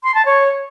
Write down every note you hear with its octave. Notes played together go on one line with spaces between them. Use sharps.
C6
A5
C#5